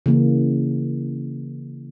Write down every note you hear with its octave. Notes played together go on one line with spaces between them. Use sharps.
C#3 E3 A#3